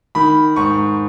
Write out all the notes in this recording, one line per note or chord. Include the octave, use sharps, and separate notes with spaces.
D#3 B5
G#2 C#6